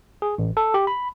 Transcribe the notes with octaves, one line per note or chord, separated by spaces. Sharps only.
G#4
A1
A4
G4
B5